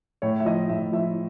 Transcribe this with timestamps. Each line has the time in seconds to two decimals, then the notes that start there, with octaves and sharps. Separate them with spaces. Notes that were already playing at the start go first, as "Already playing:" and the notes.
0.22 A2 C#5
0.40 E5
0.45 F3 D#5
0.69 A2 E5
0.92 F3 E5